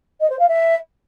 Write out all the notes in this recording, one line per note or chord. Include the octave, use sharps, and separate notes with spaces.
D#5
C5
F5
E5